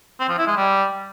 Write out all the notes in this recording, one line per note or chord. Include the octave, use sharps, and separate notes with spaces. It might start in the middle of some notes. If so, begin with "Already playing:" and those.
C4
F3
E4
G#3
G3